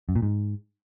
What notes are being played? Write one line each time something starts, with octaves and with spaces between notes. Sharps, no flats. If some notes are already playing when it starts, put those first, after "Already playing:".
F#2
A#2
G#2